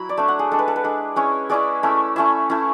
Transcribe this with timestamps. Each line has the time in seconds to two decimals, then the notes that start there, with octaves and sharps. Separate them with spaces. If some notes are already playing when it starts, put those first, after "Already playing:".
Already playing: F#3 E4 B5
0.09 D5
0.17 A3 D4 E5
0.28 F#5
0.39 G#4
0.51 G#3 D4 A4
0.59 B4
0.68 A4
0.76 B4
0.84 G#3 D4
1.16 G#3 C#4 E4 C#5
1.49 G#3 C#4 E4 D5
1.83 A3 C#4 E4
2.16 A3 C#4 E4 E5
2.50 A3 C#4 E4